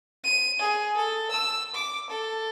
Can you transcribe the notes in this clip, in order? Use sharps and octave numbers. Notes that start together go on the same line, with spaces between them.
D#7
G#4
A4
E6
D6
A4